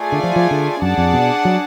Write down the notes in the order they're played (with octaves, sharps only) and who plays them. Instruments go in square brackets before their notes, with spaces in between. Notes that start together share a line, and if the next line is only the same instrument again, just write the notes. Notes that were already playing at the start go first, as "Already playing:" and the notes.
Already playing: [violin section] A3 F4 G#4 D5 G#5
[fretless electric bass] D3
F3
F3
D3
[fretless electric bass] F#2 [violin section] D4 G#4 D5 F#5 A5
[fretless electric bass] F2
B2
F#3